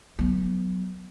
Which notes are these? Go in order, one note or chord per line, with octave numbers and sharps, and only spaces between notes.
F#3 B3